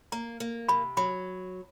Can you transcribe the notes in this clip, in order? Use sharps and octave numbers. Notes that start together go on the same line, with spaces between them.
A#3 A#5
A#3
C3 B5
F#3 B5